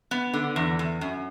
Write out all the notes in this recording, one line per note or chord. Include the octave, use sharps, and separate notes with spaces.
B3
D3
E2
E2
F#2